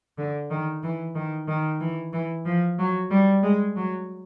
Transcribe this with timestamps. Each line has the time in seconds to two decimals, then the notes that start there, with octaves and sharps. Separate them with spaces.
0.18 D3
0.50 D#3
0.83 E3
1.15 D#3
1.48 D#3
1.80 E3
2.13 E3
2.45 F3
2.78 F#3
3.10 G3
3.43 G#3
3.76 F#3